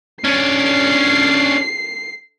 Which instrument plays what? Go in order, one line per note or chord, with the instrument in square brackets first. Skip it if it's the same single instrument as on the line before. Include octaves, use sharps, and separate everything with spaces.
[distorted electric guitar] C#4 D4 [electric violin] C7